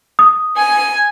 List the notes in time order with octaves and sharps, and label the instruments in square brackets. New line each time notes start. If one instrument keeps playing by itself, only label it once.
[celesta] D#6
[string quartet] G#5